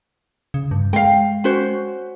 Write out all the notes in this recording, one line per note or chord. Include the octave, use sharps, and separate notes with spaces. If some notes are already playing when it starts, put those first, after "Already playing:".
C#3
G2
G#3 F5 G5
C#4 F#4 C5